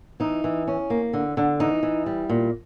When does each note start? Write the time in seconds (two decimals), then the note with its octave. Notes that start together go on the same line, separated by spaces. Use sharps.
0.20 E3 D#4
0.44 E3
0.67 C#4
0.90 A#3
1.13 D3
1.37 D3
1.60 E3 D#4
1.83 E3
2.06 G3
2.29 A#2